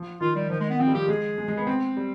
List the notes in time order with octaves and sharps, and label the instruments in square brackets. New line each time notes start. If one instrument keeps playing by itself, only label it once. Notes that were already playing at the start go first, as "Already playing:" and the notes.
Already playing: [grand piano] F3
[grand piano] D#3 [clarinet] F4
[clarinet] G3
[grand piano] D#3 [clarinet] F3
[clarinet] G#3
B3
[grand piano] F3 [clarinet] C4
[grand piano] G3
[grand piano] F3 [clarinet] G4
[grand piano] G#3 [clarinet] G#4
[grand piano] G#3
G#3
B3
C4
G3